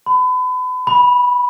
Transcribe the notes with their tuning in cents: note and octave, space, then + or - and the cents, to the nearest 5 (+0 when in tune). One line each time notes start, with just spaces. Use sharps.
B5 +35
B5 -10